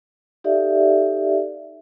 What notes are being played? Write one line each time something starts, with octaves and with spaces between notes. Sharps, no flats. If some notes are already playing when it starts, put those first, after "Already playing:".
D#4 G4 A4 D5 E5 F5